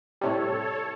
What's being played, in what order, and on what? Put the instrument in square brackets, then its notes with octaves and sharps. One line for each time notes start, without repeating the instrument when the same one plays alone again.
[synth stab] A2 C3 G3 [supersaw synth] A4 C#5